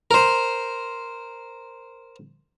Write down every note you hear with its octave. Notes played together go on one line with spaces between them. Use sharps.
A#4 C5